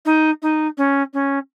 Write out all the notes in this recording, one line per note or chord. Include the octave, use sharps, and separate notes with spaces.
D#4
D#4
C#4
C#4